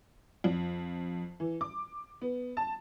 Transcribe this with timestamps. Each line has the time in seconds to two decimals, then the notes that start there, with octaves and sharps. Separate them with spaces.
0.44 F2
1.40 E3
1.61 D6
2.22 B3
2.57 A5